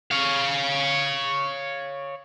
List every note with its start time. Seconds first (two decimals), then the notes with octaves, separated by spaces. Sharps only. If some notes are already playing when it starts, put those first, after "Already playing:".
0.11 C#5 F5